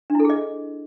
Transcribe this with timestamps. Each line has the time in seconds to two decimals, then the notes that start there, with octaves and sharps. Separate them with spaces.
0.10 D4
0.15 E4
0.20 A4
0.25 G#4
0.30 D#5